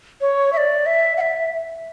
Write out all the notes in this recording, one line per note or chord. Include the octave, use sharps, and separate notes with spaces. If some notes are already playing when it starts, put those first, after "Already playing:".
C#5
E5
D5
E5
F#5
E5